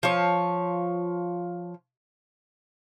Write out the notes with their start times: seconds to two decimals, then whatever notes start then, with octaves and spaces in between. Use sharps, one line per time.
0.03 F3 C#5